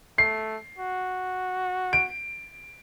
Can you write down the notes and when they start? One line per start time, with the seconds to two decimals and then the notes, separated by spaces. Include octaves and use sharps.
0.18 A3 C7
0.78 F#4
1.93 D7